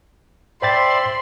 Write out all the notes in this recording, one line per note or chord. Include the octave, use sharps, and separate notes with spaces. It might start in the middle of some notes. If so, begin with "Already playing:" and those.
C5 D5 E5 G5 B5 C6 A6